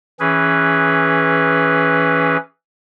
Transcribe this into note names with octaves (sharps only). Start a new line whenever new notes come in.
E3 C#4 G#4 B4